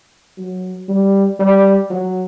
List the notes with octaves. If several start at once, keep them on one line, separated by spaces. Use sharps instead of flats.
F#3
G3
G3
F#3